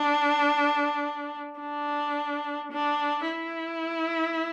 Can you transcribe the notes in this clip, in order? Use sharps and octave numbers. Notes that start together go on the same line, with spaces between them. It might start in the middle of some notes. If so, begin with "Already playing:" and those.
Already playing: D4
D4
D4
E4